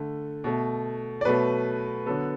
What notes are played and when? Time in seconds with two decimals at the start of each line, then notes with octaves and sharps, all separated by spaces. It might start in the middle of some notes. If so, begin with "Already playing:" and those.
Already playing: D3 A3
0.44 B2 A3
1.21 D5
1.25 B2 F#3 A3 B4
2.06 D3 F#3 B3 A4